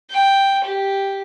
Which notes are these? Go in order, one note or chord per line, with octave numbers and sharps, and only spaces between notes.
G5
G4